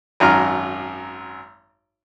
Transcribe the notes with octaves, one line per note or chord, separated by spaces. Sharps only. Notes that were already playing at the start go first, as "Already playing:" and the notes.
G#1 F#2 A#5 F6